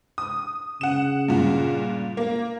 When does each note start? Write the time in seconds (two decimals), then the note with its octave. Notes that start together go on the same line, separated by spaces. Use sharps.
0.18 D#6
0.81 C#3 F#5 E7
1.28 G2 A#2
2.17 A#3